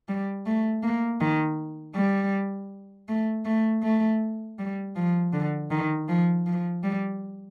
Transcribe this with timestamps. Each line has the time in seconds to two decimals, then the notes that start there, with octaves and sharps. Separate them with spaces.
0.08 G3
0.46 A3
0.83 A#3
1.20 D#3
1.95 G3
3.08 A3
3.45 A3
3.83 A3
4.59 G3
4.96 F3
5.33 D3
5.71 D#3
6.09 F3
6.47 F3
6.83 G3